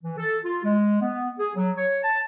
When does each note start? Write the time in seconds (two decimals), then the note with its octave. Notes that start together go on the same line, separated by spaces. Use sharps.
0.03 E3
0.17 A4
0.43 F4
0.63 G#3
1.00 B3
1.38 G#4
1.55 F#3
1.77 C#5
2.02 A5